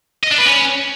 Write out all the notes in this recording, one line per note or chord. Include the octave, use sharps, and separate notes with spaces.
D#5
D4
B4
C#4